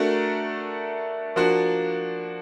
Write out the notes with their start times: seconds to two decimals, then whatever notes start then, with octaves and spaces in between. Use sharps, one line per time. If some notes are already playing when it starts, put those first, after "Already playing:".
Already playing: A3 D4 F#4 A#4
1.36 F3 A#3 D4 F#4